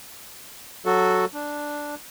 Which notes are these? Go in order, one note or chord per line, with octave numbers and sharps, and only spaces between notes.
F#3 F#4 A4
D4